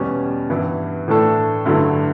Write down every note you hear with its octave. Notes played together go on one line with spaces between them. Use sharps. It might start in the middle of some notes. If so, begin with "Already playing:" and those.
Already playing: E2 B2 G3 C#4
G2 E3 B3 E4
A2 E3 A3 D4 A4
G2 D3 F#3 A3 E4